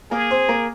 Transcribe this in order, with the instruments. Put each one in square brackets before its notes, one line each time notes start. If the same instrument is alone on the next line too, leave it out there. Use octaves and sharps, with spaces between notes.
[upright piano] A#3 A#4 [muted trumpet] G#4
[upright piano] C4 C5
A#3 A#4